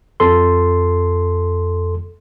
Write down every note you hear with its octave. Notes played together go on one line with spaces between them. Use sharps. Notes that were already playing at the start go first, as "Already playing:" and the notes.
F2 A4 C6